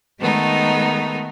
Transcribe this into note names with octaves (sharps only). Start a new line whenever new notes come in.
D#3 G#3 A3 B3 D#4